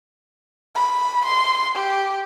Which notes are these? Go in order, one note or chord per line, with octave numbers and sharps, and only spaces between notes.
B5
C6
G4